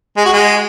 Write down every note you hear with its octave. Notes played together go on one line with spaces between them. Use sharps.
G#3
F#4
G#3